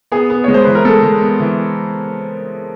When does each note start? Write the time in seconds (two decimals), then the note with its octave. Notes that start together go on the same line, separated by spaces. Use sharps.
0.12 B3 G#4
0.30 B3
0.44 G#3 C#5
0.54 C5
0.64 E3 B4
0.75 A#4
0.85 G#3 A4
1.03 G#3
1.21 B3
1.40 E3